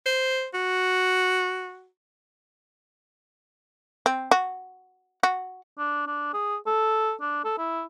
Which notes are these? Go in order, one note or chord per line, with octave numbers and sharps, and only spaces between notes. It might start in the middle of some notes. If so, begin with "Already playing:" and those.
C5
F#4
C4
F#4
F#4
D4
D4
G#4
A4
D4
A4
E4